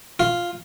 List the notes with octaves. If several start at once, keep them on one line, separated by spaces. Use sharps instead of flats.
F4